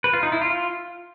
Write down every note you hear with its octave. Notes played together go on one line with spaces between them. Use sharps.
B4
F4
D#4
E4
F4